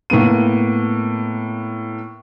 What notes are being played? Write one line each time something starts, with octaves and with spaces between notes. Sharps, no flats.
A2 A#3 B3 D#7